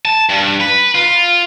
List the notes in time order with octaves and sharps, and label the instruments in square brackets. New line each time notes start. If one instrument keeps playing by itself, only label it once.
[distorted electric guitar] A5
G2
B4
F4